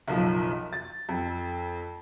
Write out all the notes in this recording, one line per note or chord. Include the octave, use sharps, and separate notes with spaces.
F#1 B1 F3
A6
F2